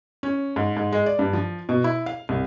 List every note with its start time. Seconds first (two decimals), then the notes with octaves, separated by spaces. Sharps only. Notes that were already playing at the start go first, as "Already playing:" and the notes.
0.23 C#4
0.56 G#2
0.77 G#2
0.92 G#3
1.06 D5
1.19 G2
1.33 F3
1.69 B2
1.84 E4
2.06 F5
2.29 C2